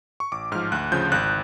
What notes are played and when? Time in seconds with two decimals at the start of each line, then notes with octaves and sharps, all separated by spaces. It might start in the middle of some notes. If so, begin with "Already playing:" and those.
0.20 C#6
0.32 A1 D6
0.52 G#2 F3 F6
0.72 D2 F#6
0.92 C#3 F3 G6
1.12 G#1 F#6